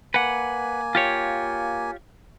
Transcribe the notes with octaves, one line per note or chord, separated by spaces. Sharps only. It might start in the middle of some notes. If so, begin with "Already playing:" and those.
A#3 B4 F#5 G#5
F4 G4 C#5